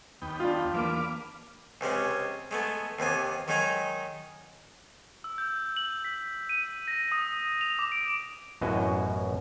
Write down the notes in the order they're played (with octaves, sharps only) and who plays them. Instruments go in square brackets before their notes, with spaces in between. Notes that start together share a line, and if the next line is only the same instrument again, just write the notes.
[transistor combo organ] D#2 B3 G5
[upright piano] D4 F4
[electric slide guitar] E2 A#3 [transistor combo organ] B4 F5 D6
[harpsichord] C#2 C3 G#3 C#4
G#3 A3 B3
D#2 C3 B3 G#5
D#3 F#3 G#3 D#4 G#5 A#5
[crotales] E6
G6
F#7
B6
D#7
A#6
D#6
F7
D6
D7
[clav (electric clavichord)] A1 F#2 B2 E4 F#4 D#5